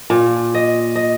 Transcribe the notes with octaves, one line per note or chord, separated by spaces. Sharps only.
A#2
D#5
D#5